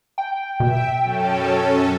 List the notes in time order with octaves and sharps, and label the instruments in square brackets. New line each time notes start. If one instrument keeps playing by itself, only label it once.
[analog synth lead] G5
[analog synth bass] B2 [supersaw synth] E5
[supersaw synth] F#2 C#4 A4